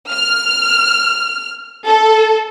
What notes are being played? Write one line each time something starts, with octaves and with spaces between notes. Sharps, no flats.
F6
A4